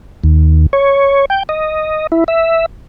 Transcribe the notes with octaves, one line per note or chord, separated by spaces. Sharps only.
D#2
C#5
G5
D#5
E4
E5